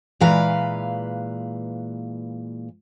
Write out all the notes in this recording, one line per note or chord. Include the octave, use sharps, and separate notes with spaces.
A#2 E3 G#3 B4 F5 A#5